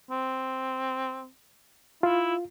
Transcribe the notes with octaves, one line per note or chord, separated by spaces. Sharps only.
C4
E4 F4